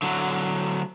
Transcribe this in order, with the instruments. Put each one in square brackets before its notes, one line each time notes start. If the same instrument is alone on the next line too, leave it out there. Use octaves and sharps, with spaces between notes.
[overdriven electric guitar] D3 F#3